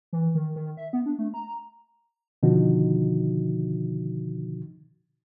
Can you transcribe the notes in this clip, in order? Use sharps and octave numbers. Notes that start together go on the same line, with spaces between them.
E3
D#3
D#3
E5
B3
D4
A3
A#5
B2 D3 D#3 F3 D#4 F#4